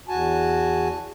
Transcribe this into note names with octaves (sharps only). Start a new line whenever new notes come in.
E2 F#4 G#5 A5